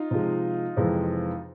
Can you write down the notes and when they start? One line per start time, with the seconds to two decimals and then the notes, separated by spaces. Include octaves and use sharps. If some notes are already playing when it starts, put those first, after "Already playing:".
Already playing: D#4 F4
0.11 C3 F3 G#3
0.77 F2 C3 E3 G#3